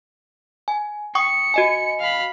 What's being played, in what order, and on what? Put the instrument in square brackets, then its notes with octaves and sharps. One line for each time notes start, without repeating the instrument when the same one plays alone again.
[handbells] G#5
[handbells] G5 C#6 D#6 [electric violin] C#7
[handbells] F#4 D#5 G#5
[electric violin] F5 B5